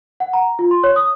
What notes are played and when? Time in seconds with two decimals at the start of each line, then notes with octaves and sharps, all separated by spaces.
0.20 F#5
0.33 A#5
0.59 F4
0.71 C6
0.84 C#5
0.96 D#6